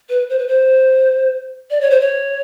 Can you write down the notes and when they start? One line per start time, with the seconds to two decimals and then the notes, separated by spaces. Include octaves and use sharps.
0.09 B4
0.30 C5
0.39 B4
0.48 C5
1.71 D5
1.81 C#5
1.90 C5
2.00 C#5